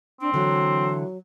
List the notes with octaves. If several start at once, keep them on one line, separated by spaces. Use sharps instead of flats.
C4 D4
D3 E3 F#3